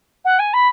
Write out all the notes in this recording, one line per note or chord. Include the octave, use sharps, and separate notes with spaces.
F#5
G#5
B5